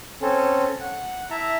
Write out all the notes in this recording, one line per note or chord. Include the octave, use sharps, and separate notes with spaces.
C4 C#4 A4
F#5
E4 E5 A5 A#5